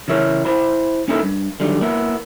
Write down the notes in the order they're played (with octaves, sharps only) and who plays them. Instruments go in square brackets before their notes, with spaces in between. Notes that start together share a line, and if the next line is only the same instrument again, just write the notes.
[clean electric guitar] C#3 E3 E4 A#4 C#5
E4 C5 B5
A#3 C#4 D#4 E4 A4 A#4
G2
D3 D#3 F#3 G3
A#3 B3 E4